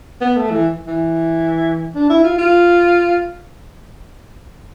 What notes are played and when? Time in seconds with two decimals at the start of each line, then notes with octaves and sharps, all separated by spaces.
0.21 B3
0.36 A3
0.51 E3
0.87 E3
1.95 D4
2.10 E4
2.24 F4
2.38 F4